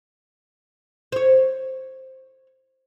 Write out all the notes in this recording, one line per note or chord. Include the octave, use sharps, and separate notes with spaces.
C5 C#5